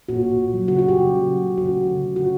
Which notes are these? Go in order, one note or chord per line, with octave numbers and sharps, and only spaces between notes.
A#2 F#4
A#2
A#2
F#3
C#3 F#4
C#3 F#4
G4
C#3
C#3
F#3
C#3
C#3 F#4
A3
D3
D3
D3 F#4